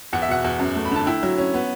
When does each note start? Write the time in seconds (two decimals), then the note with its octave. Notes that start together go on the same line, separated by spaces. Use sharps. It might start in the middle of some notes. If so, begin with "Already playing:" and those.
0.13 E2 F#5
0.22 E5
0.28 B2 F#5
0.44 E2
0.59 F#2
0.76 A3
0.85 B5
0.91 D3 A5
1.07 E4 G5
1.23 F#3
1.38 C#4
1.54 B3